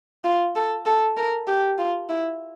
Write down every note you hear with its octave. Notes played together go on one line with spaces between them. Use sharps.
F4
A4
A4
A#4
G4
F4
E4